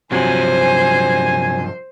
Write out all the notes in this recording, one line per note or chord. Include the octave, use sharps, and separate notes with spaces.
G2 C3 F3 F#3 C5 G#5